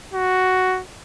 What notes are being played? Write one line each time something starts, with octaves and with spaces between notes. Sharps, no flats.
F#4